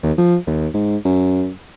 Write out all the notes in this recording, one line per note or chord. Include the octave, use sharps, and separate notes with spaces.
D#2
F3
D#2
G#2
F#2